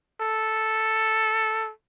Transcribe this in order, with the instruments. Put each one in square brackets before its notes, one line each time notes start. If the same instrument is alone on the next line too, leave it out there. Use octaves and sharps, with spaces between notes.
[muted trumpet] A4